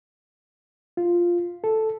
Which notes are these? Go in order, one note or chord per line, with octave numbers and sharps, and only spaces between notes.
F4
A4